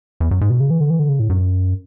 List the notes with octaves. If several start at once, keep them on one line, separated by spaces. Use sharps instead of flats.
E2
F#2
G#2
B2
C#3
E3
D3
E3
D3
C#3
A2
F#2